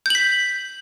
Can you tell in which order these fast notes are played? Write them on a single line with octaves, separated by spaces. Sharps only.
G6 F#7 B6